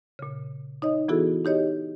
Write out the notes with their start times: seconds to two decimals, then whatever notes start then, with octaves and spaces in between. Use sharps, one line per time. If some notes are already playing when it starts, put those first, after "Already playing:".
0.19 A#2 C#3
0.82 D#4 C#5 D#5
1.08 E3 B3 E4 F#4 G#4 A4
1.45 D#4 G4 C#5 D#5